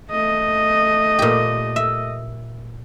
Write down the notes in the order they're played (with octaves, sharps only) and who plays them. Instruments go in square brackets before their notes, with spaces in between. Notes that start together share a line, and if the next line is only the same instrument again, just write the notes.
[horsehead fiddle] A3 D#5
[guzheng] A#2 G4
E5